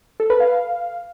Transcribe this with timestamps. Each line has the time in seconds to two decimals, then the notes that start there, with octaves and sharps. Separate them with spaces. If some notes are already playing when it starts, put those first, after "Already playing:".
0.20 A4
0.30 B4
0.40 F5